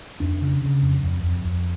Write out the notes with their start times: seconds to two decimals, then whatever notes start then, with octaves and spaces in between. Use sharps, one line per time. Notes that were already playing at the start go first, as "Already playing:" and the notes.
0.20 F2 D4
0.41 C#3
0.62 C#3
0.82 F2
1.03 F2
1.23 F2
1.44 F2